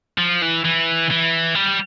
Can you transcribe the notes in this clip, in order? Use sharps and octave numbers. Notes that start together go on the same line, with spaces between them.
F3
E3
E3
E3
G3